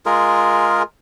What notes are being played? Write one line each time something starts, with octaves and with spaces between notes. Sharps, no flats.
G#3 F4 G#4 A#4